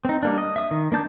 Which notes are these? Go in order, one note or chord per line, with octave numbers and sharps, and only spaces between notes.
C4 D#4
G3 A#3 D4
D#5
E5 D#6
D#3
A#3 D4 A5 G6